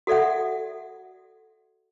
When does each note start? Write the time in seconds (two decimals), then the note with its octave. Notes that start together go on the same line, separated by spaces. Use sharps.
0.07 F#4 A4 D5 E5 F#5